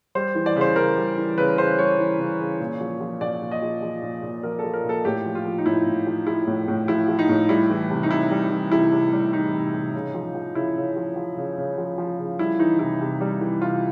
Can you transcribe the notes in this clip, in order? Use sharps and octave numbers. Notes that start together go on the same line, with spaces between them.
G3 C5
E3
D5
C#3
C5
C#3 A#4
G3
E3
C#3 B4
C#3 C5
G3 C#5
E3
C#3
C#3
A#2
F3
F3
A#2 D5
A#2
D#5
F3
F3
A#2
A#2
F3 A#4
F3 A4
A#4
A#2 A4
A2 G4
F3
F4
F3
D#4
A2 E4
A2
F3
F3 E4
A2
A2
F3 E4
F3
D#4
A2
G3 E4
E3
C3
D#4
C3 E4
G3
E3
C3 E4
C3
G3
E3 D#4
C3
C3
C#3
F3
F3
C#3 E4
C#3
F3
F3
C#3
C#3
F3
F3
C#3
G3 E4
E3 D#4
C3 E4
C3
G3
E3
C3 F4